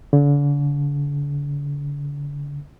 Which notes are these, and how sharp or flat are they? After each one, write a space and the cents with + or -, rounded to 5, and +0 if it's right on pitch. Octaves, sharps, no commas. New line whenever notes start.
D3 -40